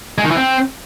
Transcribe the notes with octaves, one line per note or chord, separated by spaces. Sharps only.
G#3
D#3
E3
C4